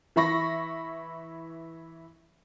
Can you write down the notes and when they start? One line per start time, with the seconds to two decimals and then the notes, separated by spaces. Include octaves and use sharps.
0.16 E3 E5 B5 C#6 A#6